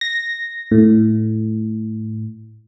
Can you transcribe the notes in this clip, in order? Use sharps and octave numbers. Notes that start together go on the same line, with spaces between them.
A#6
A2